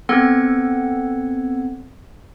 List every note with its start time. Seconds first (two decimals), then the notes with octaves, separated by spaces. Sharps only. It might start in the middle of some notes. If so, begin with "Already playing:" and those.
0.09 B3 C4 A4 F#5 G#6